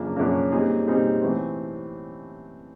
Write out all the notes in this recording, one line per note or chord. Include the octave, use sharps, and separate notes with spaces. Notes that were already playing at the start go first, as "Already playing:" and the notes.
Already playing: F#2 C#3 F3 A#3 D4
F#2 C#3 F3 A#3 D4
A#2 G3 C4 D#4 G#4
A#2 G3 C4 D#4 G#4
A2 E3 A3 C4